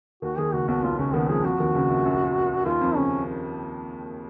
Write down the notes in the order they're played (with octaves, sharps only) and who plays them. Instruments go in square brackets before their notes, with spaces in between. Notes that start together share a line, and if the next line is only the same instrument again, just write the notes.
[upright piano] D#2 D#3 [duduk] F#4
[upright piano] D#2 D#3 [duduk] G#4
[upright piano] C#2 C#3 [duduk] F#4
[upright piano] B1 B2 [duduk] F#4
[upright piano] B1 B2 [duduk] F4
[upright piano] C#2 C#3 [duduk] C#4
[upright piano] D#2 D#3 [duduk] B3
[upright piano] F2 F3 [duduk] G#4
[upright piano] F2 F3 [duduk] F#4
[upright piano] D#2 D#3
C#2 C#3
A#1 A#2
F#2
[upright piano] D#2 D#3 [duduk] F4
[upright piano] F2 F3
[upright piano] C#3 [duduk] C#4